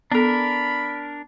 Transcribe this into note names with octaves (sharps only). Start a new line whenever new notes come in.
B3 D4 A4 A#4 B5